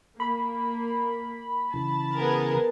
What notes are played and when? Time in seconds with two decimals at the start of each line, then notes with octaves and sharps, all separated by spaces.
0.20 A#3 B5
1.74 C#3 E3 A5
2.15 B3 G#4 A#4